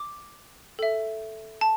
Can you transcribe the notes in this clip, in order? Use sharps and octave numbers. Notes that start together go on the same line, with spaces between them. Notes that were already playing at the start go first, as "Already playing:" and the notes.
Already playing: D6
A4 E5
A5